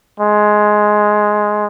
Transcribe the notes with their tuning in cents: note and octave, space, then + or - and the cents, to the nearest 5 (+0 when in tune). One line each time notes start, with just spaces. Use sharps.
G#3 +10